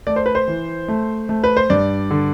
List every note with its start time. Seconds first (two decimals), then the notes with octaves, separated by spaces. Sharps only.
0.07 A3 D5
0.16 C5
0.26 B4
0.35 C5
0.48 E3
0.88 A3
1.29 A3
1.44 B4
1.57 C5
1.70 G2 D5
2.10 D3